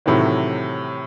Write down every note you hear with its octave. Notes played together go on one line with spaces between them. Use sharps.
A2 C3 D#3 E3 F#3